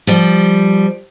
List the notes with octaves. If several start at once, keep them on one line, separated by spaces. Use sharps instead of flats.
F3 G3